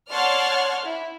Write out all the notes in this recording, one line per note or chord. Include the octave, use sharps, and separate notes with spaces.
C#5 D5 F#5 A5 C6 F6
E4